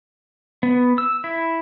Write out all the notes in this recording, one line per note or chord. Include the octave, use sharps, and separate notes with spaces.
B3
E6
E4